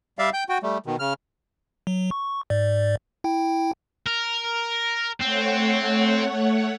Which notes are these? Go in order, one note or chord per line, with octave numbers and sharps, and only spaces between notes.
G3 D5 E5 F5
G5 G6
F#4 G5
G3 A3
B2 D#3
C#3 F6
F#3
C#6
G#2 D5
E4 G5
A#4
A3 C4 C#5 F#5